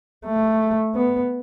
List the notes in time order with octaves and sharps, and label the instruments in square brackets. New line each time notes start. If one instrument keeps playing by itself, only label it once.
[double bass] A3
B3